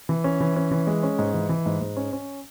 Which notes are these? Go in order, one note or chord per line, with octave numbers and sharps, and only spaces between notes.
E3
C#4
E3
C#4
E3
G#3
C#4
G#2
E3
E3
G#2
G#2
C#4
C#4